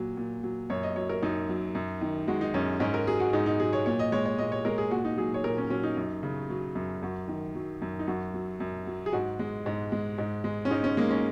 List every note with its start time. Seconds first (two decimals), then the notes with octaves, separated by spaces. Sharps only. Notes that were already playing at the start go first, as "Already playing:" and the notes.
Already playing: A#2 F#3
0.17 A#2
0.43 F#3
0.70 F#2 C#5
0.83 D#5
0.96 F#3 C#5
1.09 A#4
1.23 F#2 D#4
1.49 F#3
1.75 F#2
2.01 D#3
2.28 G#3 F#4
2.41 D#4
2.54 F#2 C#4
2.80 G#2 C#4
2.94 A#4
3.07 F#3 G#4
3.20 F#4
3.33 G#2 D#4
3.46 D#4
3.60 F#3 G#4
3.73 C#5
3.86 A#2 C#5
3.99 D#5
4.12 G#3 C#5
4.26 C#5
4.38 A#2 D#5
4.52 C#5
4.65 G#3 A#4
4.78 G#4
4.91 A#2 F#4
5.05 D#4
5.17 F#3 G#4
5.34 C#5
5.44 A#2 A#4
5.58 C#4
5.70 F#3 C#4
5.83 D#4
5.97 F#2
6.23 C#3
6.50 F#3
6.75 F#2
7.02 F#2 F#4
7.28 D#3
7.55 F#3
7.82 F#2
7.99 D#4
8.07 F#2 F#4
8.34 F#3
8.60 F#2
8.87 F#3
9.06 G#4
9.13 G#2 F#4
9.39 G#3
9.66 G#2
9.92 G#3
10.18 G#2
10.44 G#3
10.65 C#4
10.71 G#2 D#4
10.84 C#4
10.97 G#3 A#3
11.11 C#4